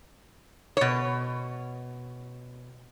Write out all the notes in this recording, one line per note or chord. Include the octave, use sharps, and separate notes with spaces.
B2 C#5